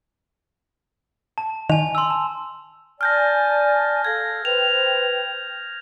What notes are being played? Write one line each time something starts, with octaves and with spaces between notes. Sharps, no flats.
A5
D#3 G#5 F7
C6 E6
A5
D5 G#5 A5 F6 G6 A#6
A4 F5 G#6 A#6
B4 C5 G5 F7